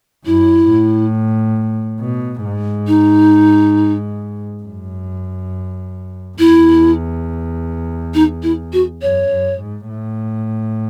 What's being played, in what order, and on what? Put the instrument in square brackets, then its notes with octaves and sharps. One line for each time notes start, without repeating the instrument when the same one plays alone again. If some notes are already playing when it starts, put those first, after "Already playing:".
[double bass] F#2 [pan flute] E4
[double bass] A2
B2
G#2
[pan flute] D#4
[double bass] F#2
[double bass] E2 [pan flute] E4
[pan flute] D#4
E4
F#4
[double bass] F#2 [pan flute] C#5
[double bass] F#2
G#2
A2